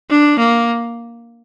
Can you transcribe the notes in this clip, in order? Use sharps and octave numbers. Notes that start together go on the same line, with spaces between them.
D4
A#3